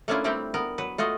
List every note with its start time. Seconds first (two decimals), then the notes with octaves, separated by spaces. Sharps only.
0.08 A3 A#3 C#4 D4 E4 F4
0.24 G3 A3 C4 G4 G5
0.54 B3 A#4
0.78 F#3 B4
0.98 A3 F4 F#4 D#5